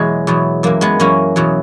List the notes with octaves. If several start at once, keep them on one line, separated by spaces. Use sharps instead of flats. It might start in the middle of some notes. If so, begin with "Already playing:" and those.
Already playing: E2 B2 F#3 G#3
E2 B2 F#3
F#2 E3 A#3
G#3 B3
F#2 E3 A#3 C#4
E2 B2 F#3